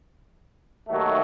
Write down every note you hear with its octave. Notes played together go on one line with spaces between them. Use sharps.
D#2 D#3 F#3 A3